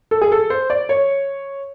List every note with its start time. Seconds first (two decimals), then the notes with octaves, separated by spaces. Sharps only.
0.11 A4
0.22 G#4
0.32 A4
0.50 C5
0.70 D5
0.89 C#5